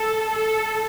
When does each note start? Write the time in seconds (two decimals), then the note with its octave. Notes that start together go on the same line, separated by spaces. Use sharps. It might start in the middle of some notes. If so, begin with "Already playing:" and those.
Already playing: A4
0.30 A4